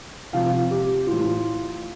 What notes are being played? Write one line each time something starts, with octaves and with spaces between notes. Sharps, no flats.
C3 F3 F5
G4
A2 E3 F4